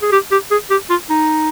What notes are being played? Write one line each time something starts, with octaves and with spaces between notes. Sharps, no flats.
G#4
G4
G4
G#4
G4
F4
D#4